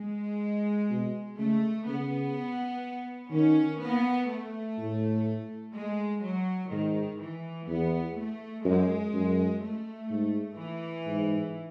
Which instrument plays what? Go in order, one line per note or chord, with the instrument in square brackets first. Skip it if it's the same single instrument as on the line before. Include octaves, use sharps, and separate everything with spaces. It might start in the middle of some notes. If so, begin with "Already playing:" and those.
Already playing: [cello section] G#3
[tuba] B2
[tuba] C#3 [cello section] A3
[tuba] C#3 [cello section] B3
[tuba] D#3 [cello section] C#4
[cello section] B3
A3
[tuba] A2
[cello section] G#3
F#3
[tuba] G#2 [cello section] D#3
[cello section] E3
[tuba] E2 [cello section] B3
[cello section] A3
[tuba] F#2 [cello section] G#3
[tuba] F#2
[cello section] A3
[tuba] G#2
[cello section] E3
[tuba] G#2